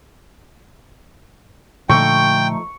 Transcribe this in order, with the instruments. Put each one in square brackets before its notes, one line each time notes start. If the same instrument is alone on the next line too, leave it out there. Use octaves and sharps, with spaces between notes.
[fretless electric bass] A#2 D3 [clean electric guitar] F3 A3 D#4 [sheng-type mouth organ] G5 [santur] C#6